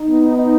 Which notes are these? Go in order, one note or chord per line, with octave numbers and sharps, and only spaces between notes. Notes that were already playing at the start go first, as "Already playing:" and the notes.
Already playing: D#4
B3
D#4